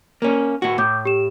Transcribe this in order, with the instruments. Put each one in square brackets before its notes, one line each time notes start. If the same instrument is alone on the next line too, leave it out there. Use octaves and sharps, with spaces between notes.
[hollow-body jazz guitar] A#3 C#4
A2 F#4
[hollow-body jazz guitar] A2 [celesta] D6 G6
[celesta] G4 E7